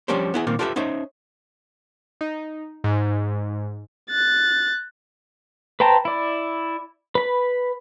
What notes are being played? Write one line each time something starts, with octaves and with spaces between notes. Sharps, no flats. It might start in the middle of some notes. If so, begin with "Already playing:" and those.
F3 G3 C#4 D4 G4 C5
B3 E4 G#4
A#2 D#3 A#3 C4
F4 G4 A4 B4 D5 E5
C#4 D#4 C5 E5
D#4
G#2
F#6 A6
B4 C5 G5 A5 A#5
E4 D5
B4 B5